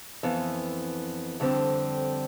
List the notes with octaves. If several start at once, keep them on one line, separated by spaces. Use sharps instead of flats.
F2 E3 B3
F2 D3 G3 C4